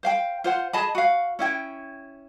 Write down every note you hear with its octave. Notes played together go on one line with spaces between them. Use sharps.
C5 F5 G5
F4 C5 F#5
G#4 D#5 A5 B5
F#4 F5
C#4 E4 G5